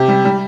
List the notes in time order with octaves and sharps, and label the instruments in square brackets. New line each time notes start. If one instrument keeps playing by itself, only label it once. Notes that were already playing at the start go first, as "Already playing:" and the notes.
Already playing: [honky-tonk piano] C3 [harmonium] G4
[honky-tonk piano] G3
G3